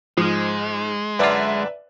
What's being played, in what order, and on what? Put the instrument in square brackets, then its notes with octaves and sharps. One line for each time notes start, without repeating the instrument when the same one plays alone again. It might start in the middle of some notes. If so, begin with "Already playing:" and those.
[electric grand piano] G#2 [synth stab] F3 [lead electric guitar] G#3
[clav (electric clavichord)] F#2 D3 F4 [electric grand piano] B4 D5 E5